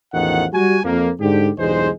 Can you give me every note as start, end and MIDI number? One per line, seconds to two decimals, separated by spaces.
0.14 0.45 33
0.14 0.45 40
0.14 0.45 51
0.14 0.45 53
0.14 0.45 78
0.53 0.78 55
0.53 0.78 66
0.53 0.78 80
0.84 1.10 41
0.84 1.10 58
1.20 1.50 44
1.20 1.50 50
1.20 1.50 67
1.58 1.89 35
1.58 1.89 40
1.58 1.89 43
1.58 1.89 56
1.58 1.89 72